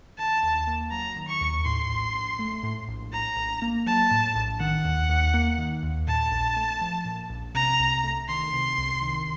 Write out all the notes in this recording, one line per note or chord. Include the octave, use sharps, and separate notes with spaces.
D#3 A5
D#2
A#3
F#3 A#5
D#3
C#6
D#2
A2 C6
A#1
A#1
A3
A2
A#1
A2 A#5
A#1
A#3
F#3 A5
A2
A#1
D#3 F#5
D#2
D#2
A#3
D#3
D#2
A#2 A5
A#1
A3
F3
A#2
A#1
C3 A#5
C2
A3
D#3 C6
C3
C2
D#3